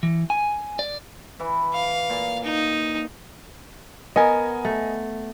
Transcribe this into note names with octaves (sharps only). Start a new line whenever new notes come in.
E3
G#5
D5
E3
F5
A#2
D#4
B3 A#4 D#5 G#5
A3